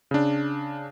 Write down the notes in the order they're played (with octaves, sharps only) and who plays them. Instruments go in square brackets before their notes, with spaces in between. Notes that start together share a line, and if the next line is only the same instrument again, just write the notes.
[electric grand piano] C#3 D4